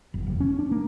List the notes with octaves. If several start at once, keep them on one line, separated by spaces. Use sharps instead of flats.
F#1
F1
C#4
D4
A#3